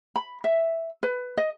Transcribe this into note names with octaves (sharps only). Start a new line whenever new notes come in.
B5
E5
B4
D#5